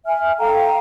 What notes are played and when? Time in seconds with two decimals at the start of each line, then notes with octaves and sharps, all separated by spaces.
0.06 E5 G#5 F6
0.39 A4 F5 G5 A#5